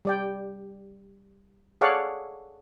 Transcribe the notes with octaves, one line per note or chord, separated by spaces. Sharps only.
G3 D5 G5
G#4 A4 C#5 D5 F5 F#5